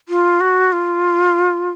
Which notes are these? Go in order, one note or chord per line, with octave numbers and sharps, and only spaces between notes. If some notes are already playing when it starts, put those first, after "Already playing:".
F4
F#4
F4